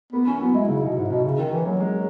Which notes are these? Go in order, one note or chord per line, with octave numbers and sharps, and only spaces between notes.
A#3 B3
E3 C#4
F#3 B3
G#3 E4
C#3 D#4
B2 D#4
G#2 D#4
B2 C#4
C#3 D#4
D#3 D#4
E3 C#4
F#3 A#3
G#3